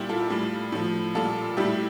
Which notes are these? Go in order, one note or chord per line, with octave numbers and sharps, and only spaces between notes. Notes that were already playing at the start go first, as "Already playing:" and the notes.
Already playing: A#2 G3 E4 G4
F4 A4
A2 G3
A2 F3
A#2 G3 F4 A4
A2 G3 E4 G4